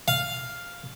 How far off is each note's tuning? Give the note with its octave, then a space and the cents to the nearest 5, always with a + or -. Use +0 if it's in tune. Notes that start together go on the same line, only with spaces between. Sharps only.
F5 +0